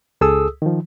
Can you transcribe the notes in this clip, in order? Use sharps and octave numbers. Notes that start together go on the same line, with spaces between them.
C#2 G#4 A4 D#6 E6
D#3 F3